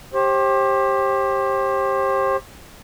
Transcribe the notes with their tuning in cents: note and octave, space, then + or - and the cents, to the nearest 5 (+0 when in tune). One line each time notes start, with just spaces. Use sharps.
G4 +0 C5 +35